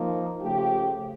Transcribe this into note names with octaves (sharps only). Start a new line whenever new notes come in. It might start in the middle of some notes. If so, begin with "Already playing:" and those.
Already playing: F3 A#3 D#4
C#3 F3 A3 G4